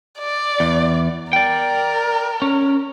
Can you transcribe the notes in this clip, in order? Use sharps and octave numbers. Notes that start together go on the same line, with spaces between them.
D5
E2
A#4 D5 G5
C#4